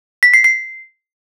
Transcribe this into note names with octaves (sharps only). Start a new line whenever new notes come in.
B6
C7
C7